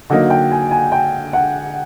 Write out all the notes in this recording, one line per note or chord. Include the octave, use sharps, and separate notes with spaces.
D3 F#3 A#3 D#4
G5
G#5
G#5
G5
F#5